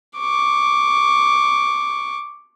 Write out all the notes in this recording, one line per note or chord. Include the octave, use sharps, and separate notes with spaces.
C#6 D6